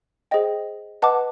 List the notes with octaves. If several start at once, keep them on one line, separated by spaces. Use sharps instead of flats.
G#4 C5 D#5 G5
B4 D#5 F#5 A5 D6